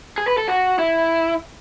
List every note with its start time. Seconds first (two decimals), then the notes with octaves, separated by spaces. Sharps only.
0.18 G#4
0.28 B4
0.38 A4
0.48 F#4
0.79 E4